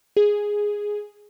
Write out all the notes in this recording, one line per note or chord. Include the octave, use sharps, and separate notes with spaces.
G#4